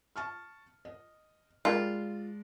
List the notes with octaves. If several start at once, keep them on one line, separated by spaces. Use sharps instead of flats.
A5 C#6 F6
D#5
C#3 G3 G#3 A#3 F4 D5 A5